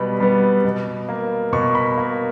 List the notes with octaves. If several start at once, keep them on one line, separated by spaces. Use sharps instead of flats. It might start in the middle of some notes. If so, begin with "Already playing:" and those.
Already playing: B2 G3 B3 B5
G3 B3
B2
A#3
B2 C#6
B5
A#3